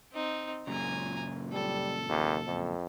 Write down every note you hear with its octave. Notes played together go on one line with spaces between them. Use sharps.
C4 D#4
F#2 A#2 C#3 G#5 A#5
G3 A4
D#2
F2